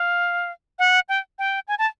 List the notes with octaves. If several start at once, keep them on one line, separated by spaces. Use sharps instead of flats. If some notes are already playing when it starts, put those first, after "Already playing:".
Already playing: F5
F#5
G5
G5
G#5
A5